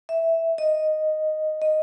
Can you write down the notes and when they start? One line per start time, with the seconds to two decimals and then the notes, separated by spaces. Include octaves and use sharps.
0.09 E5
0.58 D#5
1.62 D#5